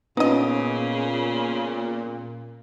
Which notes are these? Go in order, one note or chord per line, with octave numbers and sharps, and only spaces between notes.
A#2 C#3 B3 C#4 D#4 D#5